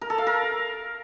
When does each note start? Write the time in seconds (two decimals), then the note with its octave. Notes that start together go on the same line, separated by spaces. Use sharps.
0.01 A#4
0.10 A4
0.18 F5
0.27 A#4